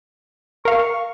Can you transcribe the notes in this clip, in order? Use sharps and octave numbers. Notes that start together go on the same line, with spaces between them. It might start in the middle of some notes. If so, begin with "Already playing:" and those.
A#4 F5 C#6